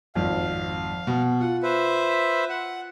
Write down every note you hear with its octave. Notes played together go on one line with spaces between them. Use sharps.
G#1 F2 F5
B2
F4 F#5
B4 C5 E5
F#5